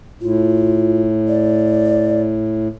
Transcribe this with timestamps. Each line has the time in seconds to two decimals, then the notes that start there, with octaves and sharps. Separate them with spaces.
0.21 A2 F4
1.28 D5